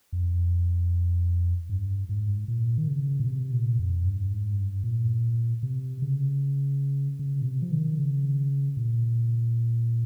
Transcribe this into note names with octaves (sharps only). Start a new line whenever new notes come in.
F2
G2
G#2
A#2
D#3
C#3
A#2
C3
A#2
F2
G2
G#2
G2
A#2
C3
C#3
C#3
A#2
C3
F3
D#3
C#3
A#2